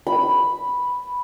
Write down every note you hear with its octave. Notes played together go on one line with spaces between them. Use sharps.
B5